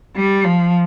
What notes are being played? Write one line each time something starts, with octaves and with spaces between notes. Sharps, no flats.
G3
F3